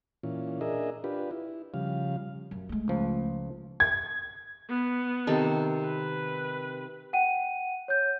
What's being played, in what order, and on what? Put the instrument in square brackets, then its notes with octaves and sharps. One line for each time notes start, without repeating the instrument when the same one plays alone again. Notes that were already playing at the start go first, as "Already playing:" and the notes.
[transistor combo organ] A#2 E3 C#4 F4
D4 G#4 A#4 D#5 E5
D4 F4 G4 B4
E4
C#3 F3 G3 F5
[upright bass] F#2
G#3 A3
[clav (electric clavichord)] C#2 F3
[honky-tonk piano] G#6
[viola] B3
[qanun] C3 D#3 A4
[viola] B4
[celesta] F#5 G5 D#7
C#5 G6